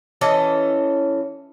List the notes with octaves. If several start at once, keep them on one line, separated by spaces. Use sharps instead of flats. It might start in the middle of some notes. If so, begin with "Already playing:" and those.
E3 C#4 A4 D#5